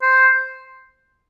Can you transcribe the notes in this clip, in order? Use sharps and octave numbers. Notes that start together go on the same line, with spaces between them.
C5